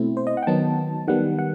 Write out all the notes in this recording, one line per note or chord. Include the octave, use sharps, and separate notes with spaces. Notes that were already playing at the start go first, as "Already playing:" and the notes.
Already playing: B2 A3 C4 E4
C5
D#5
F#5
G5
D#3 F#3 B3 D#4 A5
D#3 G3 B3 F#5
F#5